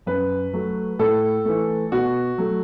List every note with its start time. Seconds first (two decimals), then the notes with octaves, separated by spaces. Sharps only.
0.06 F#2 B4
0.53 F#3 A3
0.99 A2 A4
1.45 E3 A3
1.92 B2 F#4
2.38 F#3 A3